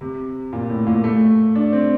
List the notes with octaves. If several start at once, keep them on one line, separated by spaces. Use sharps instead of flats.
C3
A#2
A2
A#2
A3
D4
C4